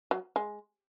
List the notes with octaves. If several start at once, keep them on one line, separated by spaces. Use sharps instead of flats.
F#3
G#3